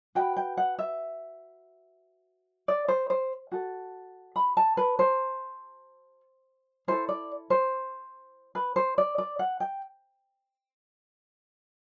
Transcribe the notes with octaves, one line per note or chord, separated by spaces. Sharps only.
F#4 B4 G5
G5
F#5
E5
D5
C5
C5
F#4 A4
B5
A5
B4
C5
E4 A4 C5
D5
C5
B4
C5
D5
D5
F#5
G5